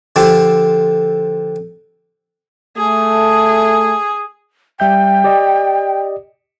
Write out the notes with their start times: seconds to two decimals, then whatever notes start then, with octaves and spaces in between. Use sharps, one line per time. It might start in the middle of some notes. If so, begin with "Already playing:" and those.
0.16 D3 F3 G4 A4
2.77 A3 G#4
4.80 G3 E5 G5 G6
5.24 G4 D5 D#5